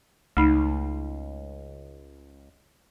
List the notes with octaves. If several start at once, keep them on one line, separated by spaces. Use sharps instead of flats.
C#2 A3 D#4